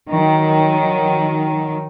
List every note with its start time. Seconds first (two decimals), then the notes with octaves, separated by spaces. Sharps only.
0.10 D#3 F#3